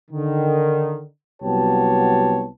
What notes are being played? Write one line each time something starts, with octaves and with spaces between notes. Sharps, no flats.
D3 D#3
C2 F#3 B3 G4 C#5 A5